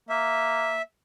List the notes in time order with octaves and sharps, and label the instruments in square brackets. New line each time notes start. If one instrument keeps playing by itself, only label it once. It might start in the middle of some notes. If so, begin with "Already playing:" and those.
[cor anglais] A#3 [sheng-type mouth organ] E5